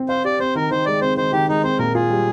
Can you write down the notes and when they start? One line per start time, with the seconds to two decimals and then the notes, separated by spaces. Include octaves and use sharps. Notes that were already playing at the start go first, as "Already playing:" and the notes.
Already playing: C4
0.09 C5 F5
0.24 G4 D5
0.40 C4 C5
0.55 D#3 A#4
0.71 D#3 C5
0.86 G#3 D5
1.01 C4 C5
1.17 D#3 C5
1.32 D#3 G4
1.48 G#3 D#4
1.64 C4 C5
1.79 A#2 A#4
1.94 F4 G#4
2.10 G3